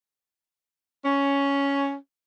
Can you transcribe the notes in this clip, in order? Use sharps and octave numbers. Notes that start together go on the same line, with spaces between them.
C#4